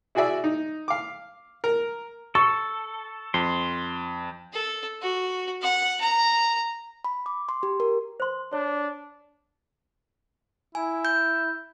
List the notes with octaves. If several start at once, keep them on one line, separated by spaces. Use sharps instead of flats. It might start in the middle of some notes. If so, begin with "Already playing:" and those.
E4 F#4 G#4 D5 E5
D#4
F5 D6
A#4
A4 C#6
F2 C6
A4
F#4
F#5
A#5
B5
D6
C6
G4
A#4
C5 C6
D4 C#5
E4 G#5
G6